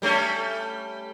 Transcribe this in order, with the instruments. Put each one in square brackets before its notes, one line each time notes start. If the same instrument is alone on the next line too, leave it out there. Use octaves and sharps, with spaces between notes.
[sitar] G3 A3 C#4